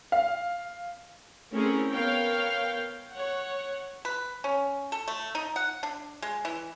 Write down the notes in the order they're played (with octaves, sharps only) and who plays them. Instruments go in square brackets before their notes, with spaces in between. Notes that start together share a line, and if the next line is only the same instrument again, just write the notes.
[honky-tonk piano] F5
[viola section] A3 C4 C#4 E4 G#4 A#4
B3 A#4 C#5 F5 G5
C#5 F#5
[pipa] B4
C#4
A4
A3
D#4
F#5
D4
G#3
E3